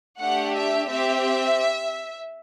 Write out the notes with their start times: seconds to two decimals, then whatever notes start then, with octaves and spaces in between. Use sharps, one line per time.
0.19 A3 D4 G4 F#5
0.55 E5
0.89 C4 G4 E5